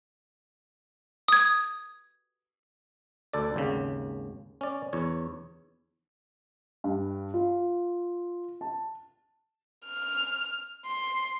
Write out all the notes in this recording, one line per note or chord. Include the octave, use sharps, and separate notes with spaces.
D#6 G#6
D2 A4 D5
G#1 D#2 C#3
C#4 D5
E2 C#5
G2
F4
A5
F6
C6